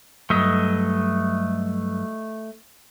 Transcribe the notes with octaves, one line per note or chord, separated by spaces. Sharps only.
G2 F#3 A3 D#5